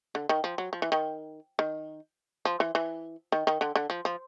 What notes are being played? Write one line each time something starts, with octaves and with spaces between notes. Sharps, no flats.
D3
D#3
F3
F#3
F3
E3
D#3
D#3
F3
E3
E3
D#3
D#3
D3
D3
F3
F3